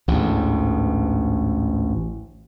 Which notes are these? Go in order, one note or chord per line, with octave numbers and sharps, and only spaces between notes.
A1 D2 G#2